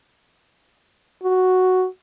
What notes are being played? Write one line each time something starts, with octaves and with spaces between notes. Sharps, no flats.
F#4